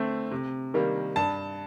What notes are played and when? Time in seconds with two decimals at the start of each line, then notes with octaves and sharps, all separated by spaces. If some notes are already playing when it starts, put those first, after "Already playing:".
Already playing: D3 A3 C4
0.31 C3
0.74 D#3 G3 A#3
1.16 G2 A5